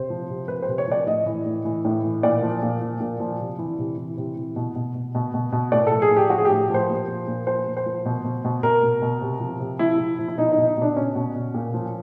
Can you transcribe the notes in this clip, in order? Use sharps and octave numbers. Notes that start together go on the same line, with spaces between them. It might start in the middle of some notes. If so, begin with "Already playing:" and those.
Already playing: C3 C5
F3
C3
F3 B4
C5
C3
C#5
F3 D5
A2 D#5
E3
A2
E3
A2
E3
A#2 D5
F3
A#2
F3
A#2
F3
C3
E3
C3
E3
C3
E3
B2
B2
B2
B2
B2
B2
A2 D5
F3 A4
G#4
A2
G4
F3 F#4
G#4
A2 G4
G4
F3 C5
A#2
F3
A#2
F3 C5
A#2
C5
F3
B2
B2
B2
B2 A#4
B2
B2
C3
F3
C3
F3 E4
C3
F3
E4
B2 D#4
D#4
B2
D#4
B2 D4
B2 C#4
B2
B2
A#2
F3